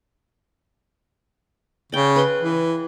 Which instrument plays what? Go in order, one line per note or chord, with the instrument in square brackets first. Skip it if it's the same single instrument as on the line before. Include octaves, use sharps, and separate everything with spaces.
[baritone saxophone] C#3 [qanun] D5 G5
[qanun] B4 C6
[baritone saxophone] E3